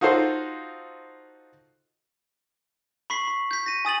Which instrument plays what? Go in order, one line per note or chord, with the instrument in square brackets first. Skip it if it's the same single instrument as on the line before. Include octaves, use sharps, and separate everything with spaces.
[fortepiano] D#4 F4 F#4 A4 C5
[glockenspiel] B5 C#6 B6 C7
B5
G6 B6
A#6 D#7
G#5 D#6 A6 F#7